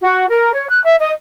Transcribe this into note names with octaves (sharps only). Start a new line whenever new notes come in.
F#4
A#4
C#5
F#6
E5
D#5